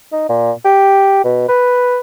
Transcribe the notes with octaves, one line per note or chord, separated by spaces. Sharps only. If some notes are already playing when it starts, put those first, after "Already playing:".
D#4
A#2
G4
B2
B4